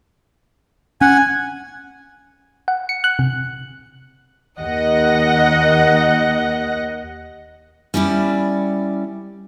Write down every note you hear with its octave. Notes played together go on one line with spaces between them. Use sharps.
C#4 F#5 G#5
F#5
C#7
F#6
C3
D#2 D#5 F#5 A#6
G3 C#4 E4 D5